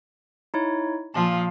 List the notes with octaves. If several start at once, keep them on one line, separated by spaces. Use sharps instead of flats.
D#4 E4 C#5
A#2 F3 F5 A5